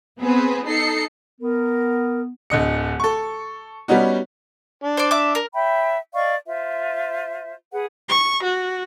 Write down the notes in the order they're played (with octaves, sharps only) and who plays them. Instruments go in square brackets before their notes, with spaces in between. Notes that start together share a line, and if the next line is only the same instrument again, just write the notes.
[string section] B3 C4 G#4 B4 C5
D#4 A4 C7 C#7
[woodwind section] B3 [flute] A#4
[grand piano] D1 D3 D#5 C#7
A4 C#6
G3 B3 C#4 D#4 F#4
[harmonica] D4
[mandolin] C5 D5
E5 D6
A#4
[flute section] C#5 E5 G5 B5
D5 D#5 F5 C#6
F4 C5 E5
G#4 B4 F#5
[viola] C#6
F#4